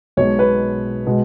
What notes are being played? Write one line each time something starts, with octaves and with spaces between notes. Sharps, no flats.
B1 B2 G#3 C#5
B4
B2 G#3